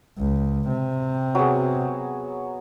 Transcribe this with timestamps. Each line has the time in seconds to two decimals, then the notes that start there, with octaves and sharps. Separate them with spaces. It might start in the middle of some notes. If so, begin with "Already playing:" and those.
0.18 C#2
0.68 C3
1.35 F#3 B3 G#4